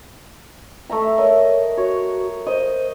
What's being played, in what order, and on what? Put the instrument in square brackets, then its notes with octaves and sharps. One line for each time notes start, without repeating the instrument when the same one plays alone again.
[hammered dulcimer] A3 E5 A#5
[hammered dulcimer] A#4 D#5 [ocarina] C#5
[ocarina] F#4 [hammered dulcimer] C#5
[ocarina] C5 [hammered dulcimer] D#5